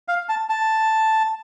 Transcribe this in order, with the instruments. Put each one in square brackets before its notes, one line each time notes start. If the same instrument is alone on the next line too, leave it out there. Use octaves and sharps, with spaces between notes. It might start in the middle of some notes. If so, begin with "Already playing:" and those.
[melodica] F5
A5
A5